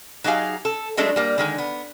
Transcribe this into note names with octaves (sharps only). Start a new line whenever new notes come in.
F#3 D#4 G4 G#4 F5
A4
F#3 G#3 A3 D4
G3 A#3
D3 D#3 G#3
B3